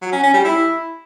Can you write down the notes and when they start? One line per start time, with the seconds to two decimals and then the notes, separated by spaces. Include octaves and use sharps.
0.02 F#3
0.12 C#4
0.23 C#4
0.34 G3
0.45 E4